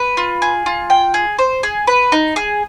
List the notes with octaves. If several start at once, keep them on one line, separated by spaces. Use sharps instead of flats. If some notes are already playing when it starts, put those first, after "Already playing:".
Already playing: B4
F4
G#4
F4
G5
G#4
C5
G#4
B4
D#4
G#4